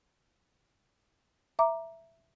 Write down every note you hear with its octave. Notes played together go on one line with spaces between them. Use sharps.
E5 A#5 D6